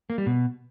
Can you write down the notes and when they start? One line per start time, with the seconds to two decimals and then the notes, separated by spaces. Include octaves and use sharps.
0.10 A#3
0.18 G3
0.26 B2